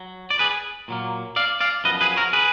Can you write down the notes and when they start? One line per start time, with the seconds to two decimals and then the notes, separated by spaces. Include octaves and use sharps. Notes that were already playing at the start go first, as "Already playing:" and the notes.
Already playing: F#3
0.30 D5
0.39 G#4 B4
0.88 A#2 F#3 A#3
1.36 D5 F5
1.60 D5 F5
1.84 F#2 F3 B3 B4 D#5
2.01 G#4 B4
2.16 F#4 A#4
2.33 G#4 B4